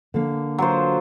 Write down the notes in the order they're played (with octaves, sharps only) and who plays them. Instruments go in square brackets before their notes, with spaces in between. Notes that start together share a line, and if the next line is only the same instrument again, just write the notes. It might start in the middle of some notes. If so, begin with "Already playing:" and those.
[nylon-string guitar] D3 A#3
[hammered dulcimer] F#3 F4 C5